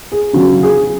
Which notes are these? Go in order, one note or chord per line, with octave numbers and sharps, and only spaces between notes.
G#4
C#3 F#3 F#4
G#4